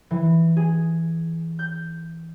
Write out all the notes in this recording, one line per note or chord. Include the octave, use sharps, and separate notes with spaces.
E3
G#4
G6